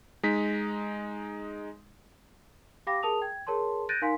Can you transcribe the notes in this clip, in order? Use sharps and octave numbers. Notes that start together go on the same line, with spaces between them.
G#3 D#4 B6
G4 F5 G5 B5 D6 A#6
G#4 A#4 A5 D#6 F7
G5 G#6
G#4 A#4 C#5 A5 C6
F#6 G6 A6 A#6 D7 D#7
D#4 A#4 F5 G#5 C6 B6